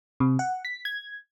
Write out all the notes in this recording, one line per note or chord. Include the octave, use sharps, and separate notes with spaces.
C3
F#5
B6
G#6